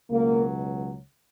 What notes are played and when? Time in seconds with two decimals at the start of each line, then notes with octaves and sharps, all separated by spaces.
0.11 C#2 B2 F#3 A#3